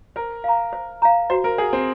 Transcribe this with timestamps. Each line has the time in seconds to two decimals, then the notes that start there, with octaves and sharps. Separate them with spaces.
0.16 A#4 C5
0.44 F5 A#5
0.73 C5
1.02 F5 A#5
1.30 F#4 C5
1.44 A#4
1.58 G#4 C5
1.62 F#5
1.73 C4